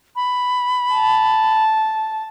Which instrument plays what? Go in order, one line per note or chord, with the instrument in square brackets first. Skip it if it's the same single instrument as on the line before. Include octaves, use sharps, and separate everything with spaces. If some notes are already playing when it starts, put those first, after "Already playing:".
[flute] B5
[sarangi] A5